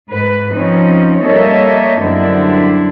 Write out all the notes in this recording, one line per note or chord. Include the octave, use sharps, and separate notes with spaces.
G#2 B4
F3 C4 C#4 D#4
G3 A#3 A4 C#5 D#5 E5
F#2 D3 G3 C4 D4 E4